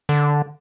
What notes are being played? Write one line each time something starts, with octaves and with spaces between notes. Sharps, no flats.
D3